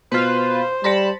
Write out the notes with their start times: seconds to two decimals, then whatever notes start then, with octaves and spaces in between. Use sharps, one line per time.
0.12 B2 F4 B4 C5 C7
0.84 G3 A5 B5 C6 A#6 C#7